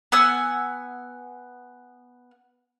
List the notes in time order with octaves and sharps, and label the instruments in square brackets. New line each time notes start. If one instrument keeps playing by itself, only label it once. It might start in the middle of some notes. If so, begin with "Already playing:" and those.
[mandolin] B3 F#5 G#5 E6